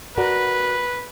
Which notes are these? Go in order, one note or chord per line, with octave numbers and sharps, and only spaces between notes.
F#4 A#4 B4 D5